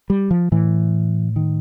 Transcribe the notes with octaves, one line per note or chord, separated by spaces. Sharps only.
G3
F3
A2 E3
D#3